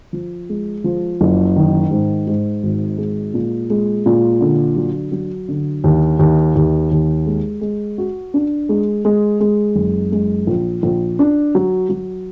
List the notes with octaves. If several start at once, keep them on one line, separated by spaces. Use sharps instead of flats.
F3
G#3
F3
F#1
D#3
G#2
G#2
G#1
G#3
A#2
G#3
A#2
D3
F#3
F#3
D3
D#2
D#2
D#2
D#2
G#3
G#3
F#4
D4
G#3
G#3
G#3
F#1
G#3
A#1
A#1
D4
F#3
F#3